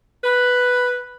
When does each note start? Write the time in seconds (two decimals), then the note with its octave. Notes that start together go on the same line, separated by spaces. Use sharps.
0.24 B4